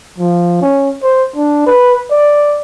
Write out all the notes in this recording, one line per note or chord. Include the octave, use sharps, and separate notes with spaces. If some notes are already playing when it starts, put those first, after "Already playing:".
F3
C#4
C5
D4
B4
D5